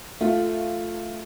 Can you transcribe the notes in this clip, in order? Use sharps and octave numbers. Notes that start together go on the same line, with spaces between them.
A3 F4